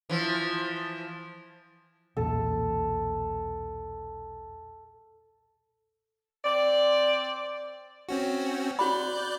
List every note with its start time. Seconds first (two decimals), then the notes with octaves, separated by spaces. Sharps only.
0.10 E3 F3
2.17 B1 E2 A#2 A4
6.44 C4 D5
8.09 C4 C#4 F#4
8.79 F#4 D5 B5 F#6 G6